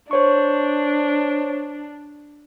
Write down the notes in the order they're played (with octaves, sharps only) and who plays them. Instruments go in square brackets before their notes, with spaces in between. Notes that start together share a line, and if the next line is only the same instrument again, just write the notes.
[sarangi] D4 [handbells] C5 C#5 C#6